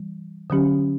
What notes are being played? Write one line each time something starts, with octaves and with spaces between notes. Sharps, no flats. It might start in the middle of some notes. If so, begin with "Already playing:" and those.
Already playing: E3 G3
D3 F#3 C#4 G4